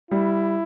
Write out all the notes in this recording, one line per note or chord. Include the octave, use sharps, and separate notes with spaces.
G3 E4